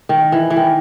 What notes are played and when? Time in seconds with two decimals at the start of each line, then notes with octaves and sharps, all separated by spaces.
0.09 D#3
0.32 E3
0.50 E3
0.56 D#3